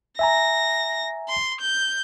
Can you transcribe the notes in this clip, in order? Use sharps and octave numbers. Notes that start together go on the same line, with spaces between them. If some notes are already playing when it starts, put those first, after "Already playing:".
E5 G#5 A#5 A#6
C6
G6